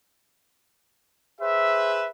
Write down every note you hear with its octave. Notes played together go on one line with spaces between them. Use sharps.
G#4 B4 C5 E5